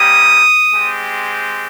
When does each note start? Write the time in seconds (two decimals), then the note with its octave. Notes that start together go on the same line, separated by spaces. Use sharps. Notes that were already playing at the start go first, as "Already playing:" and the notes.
Already playing: G3 A#3 C#4 G4 D#6
0.74 G#3 C4 G4